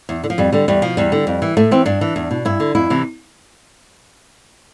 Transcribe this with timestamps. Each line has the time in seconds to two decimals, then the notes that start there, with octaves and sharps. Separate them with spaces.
0.09 E2
0.24 D3
0.30 F3
0.38 F2 G3
0.52 D3 G3
0.68 E2 G3
0.82 B2 F3
0.97 E2 G3
1.12 D3
1.27 F2
1.42 E3
1.57 A2 A3
1.71 E3 C4
1.86 G2 D4
2.01 E3
2.16 E2
2.31 B2
2.45 G2 E4
2.60 D3
2.75 F2 E4
2.90 C3 E3